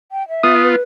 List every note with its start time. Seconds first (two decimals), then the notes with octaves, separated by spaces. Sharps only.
0.12 G5
0.29 E5
0.43 B3 F4 D#6
0.62 B4